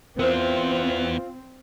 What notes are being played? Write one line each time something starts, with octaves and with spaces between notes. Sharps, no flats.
B3 C4 E4 F4 A#4 C5